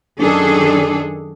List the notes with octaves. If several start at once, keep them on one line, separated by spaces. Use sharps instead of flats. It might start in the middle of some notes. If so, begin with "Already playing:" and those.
F#2 D#3 D4 G#4 A4